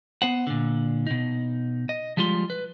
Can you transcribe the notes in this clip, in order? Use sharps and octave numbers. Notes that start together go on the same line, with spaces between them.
B3 C5 F#5
A#2 D3
B2 D#4
D#5
F3 G3 G#3 F4 C6
B4